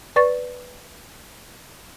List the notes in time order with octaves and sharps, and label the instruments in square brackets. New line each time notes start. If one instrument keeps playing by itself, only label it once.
[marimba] B4 D5 C#6 A6